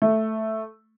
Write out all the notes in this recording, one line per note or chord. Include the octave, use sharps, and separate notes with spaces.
A3